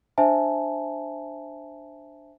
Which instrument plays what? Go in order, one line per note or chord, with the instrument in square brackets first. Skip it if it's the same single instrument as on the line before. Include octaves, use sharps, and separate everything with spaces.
[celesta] D4 C5 E5 G#5 A5